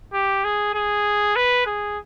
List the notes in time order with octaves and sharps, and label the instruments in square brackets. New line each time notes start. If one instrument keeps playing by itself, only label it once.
[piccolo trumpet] G4
G#4
G#4
B4
G#4